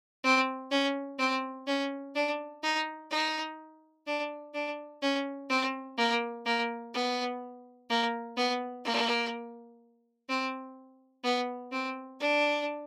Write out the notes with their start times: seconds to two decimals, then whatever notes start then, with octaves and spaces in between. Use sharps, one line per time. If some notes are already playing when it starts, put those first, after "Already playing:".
0.24 C4
0.71 C#4
1.19 C4
1.67 C#4
2.15 D4
2.63 D#4
3.11 D#4
4.07 D4
4.54 D4
5.02 C#4
5.50 C4
5.98 A#3
6.46 A#3
6.94 B3
7.90 A#3
8.37 B3
8.85 A#3
10.29 C4
11.24 B3
11.72 C4
12.21 D4